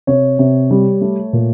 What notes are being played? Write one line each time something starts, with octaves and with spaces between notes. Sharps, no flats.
C3 C#5
C3
G3
A3
A#2